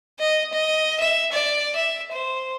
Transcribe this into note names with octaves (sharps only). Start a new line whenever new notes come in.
D#5
D#5
E5
D5
E5
C5